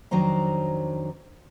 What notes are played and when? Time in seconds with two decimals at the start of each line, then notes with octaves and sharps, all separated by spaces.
0.11 F2 D#3 F#3 D4 C5 A#5